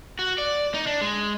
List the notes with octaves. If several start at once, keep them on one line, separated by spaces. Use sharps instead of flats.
F#4
D5
D#4
D4
G#3